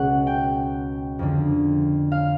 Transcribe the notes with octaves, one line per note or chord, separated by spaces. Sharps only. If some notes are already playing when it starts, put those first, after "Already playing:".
Already playing: C#2 B2 F#5
G5
F2 D3
F5